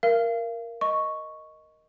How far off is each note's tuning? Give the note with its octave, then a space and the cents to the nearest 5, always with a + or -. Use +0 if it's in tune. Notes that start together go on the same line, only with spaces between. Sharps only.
A#4 +0 F5 -35
D#5 +0 C#6 +0